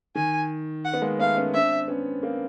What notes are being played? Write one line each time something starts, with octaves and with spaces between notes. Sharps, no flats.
D#3 G#5
F#5
B3
G#3 A#3
A3 B3 F5
B3 C#4
C4 D4 E5
B3 C#4
A#3 C4